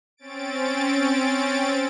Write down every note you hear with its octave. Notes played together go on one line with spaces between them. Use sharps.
C4 C#4 A6 D7